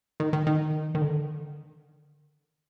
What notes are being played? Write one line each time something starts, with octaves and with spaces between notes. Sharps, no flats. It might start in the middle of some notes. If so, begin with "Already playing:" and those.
D#3
D#3
D#3
D#3
D3